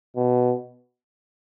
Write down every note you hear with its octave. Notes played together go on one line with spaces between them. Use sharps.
B2